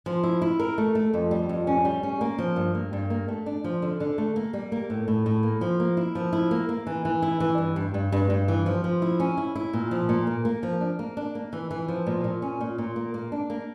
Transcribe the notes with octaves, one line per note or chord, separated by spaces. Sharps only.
F3
E4
E4
A#4
A3
A3
F2
G3
F2
C#4
G3
C#4
A#3
F3
G2
A#3
G2
A#3
A3
D4
F3
D3
D3
A3
A#3
G3
A#3
A2
A2
A2
A#3
F3
A#3
E4
F3
E4
A#3
A#3
E3
E3
E4
E3
G2
G2
G2
G2
G2
E3
F3
F3
E4
C#4
E4
E4
A#2
F3
A#2
A#3
A#3
F3
D4
A#3
D4
A#3
E3
E3
F3
A#2
A#2
C#4
A#2
A#2
A#3
A#3
D4
A#3